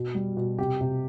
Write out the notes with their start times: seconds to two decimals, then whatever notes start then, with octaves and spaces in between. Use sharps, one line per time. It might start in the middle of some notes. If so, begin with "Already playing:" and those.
Already playing: B2
0.14 G3
0.37 B2
0.58 C3 G4
0.81 C3